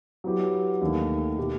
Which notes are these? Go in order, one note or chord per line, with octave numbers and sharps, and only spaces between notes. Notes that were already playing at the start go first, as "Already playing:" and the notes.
F#3 B3 E4 G4
D#2 D#3 A3
B2 A3 D#4 G4